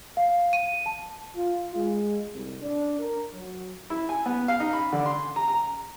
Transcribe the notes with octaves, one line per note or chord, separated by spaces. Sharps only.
F5
D#7
A5
F4
G#3
C2
D4
A#4
F#3
E4
G#5
B3
F5
D#4
B5
D3
C6
A#5
A#5